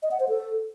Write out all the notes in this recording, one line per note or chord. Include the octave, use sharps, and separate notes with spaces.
D#5
F#5
C5
A4